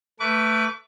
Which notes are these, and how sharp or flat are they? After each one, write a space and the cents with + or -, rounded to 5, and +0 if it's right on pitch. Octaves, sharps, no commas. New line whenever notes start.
A3 +15 B4 +0 D6 -40